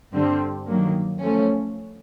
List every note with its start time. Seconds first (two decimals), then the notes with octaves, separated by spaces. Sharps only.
0.12 G2 D3 G3 C4
0.66 D#3 F#3 A#3
1.20 F3 A3 C#4